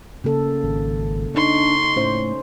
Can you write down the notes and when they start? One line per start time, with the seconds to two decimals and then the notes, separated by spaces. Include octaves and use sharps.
0.24 C#3 A#3 A4
0.63 G#1
1.35 D4 D#4 C6 C#6
1.97 A2 C#4 C5